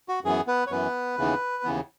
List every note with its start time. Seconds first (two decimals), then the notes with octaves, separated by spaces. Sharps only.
0.09 F#4
0.24 F#2 E3 B3 G#4
0.47 B3 B4
0.67 C#5
0.70 F#2 E3 B3 B4
1.18 D#2 C#3 E3 B3
1.64 D#2 C#3 E3 B3